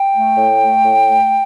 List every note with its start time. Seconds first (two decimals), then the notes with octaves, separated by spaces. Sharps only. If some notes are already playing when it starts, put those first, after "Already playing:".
Already playing: G5
0.14 A3
0.37 A2
0.60 A3
0.83 A2
1.07 A3